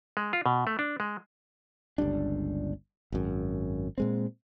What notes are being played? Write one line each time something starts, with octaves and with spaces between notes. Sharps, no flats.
G#3
F4
B2
A3
D4
G#3
G1 C#2 G3 D4
G#1 F#2
A#2 G#3 C4